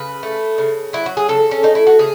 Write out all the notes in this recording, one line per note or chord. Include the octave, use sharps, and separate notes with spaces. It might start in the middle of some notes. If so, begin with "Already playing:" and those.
Already playing: C#3 B4
A3
C#3
F#3 E4
F#4
G#4
C#3 A4
C#4
A3 D#4
E4
F#4
C#3 G#4